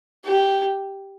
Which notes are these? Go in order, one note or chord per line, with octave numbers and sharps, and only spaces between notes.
G4